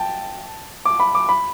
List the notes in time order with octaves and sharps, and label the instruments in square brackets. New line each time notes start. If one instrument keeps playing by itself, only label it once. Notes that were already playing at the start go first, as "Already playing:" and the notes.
Already playing: [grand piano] G5 A5
D6
B5
D6
B5